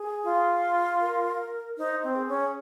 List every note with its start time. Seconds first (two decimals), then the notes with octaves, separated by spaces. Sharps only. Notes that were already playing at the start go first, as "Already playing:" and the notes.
Already playing: G#4
0.24 F4
1.01 A#4
1.77 D#4 C5
2.04 C4
2.15 G#4
2.29 C#4